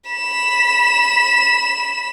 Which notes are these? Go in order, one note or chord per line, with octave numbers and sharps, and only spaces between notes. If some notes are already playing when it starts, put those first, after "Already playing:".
B5 E7